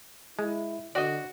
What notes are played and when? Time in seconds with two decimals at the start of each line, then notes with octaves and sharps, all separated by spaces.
0.39 G#3 E4
0.95 D3 F#4 D5 D#5